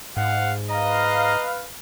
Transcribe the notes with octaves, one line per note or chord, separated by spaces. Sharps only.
G#2 F5 F#5
B4 D#5 F5 A#5